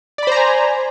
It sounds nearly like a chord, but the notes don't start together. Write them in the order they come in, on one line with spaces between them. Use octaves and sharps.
D5 B5 C5 A#5 G#5